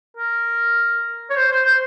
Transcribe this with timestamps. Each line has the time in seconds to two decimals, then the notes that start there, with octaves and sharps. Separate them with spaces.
0.17 A#4
1.30 C#5
1.36 C5
1.51 C5
1.66 C5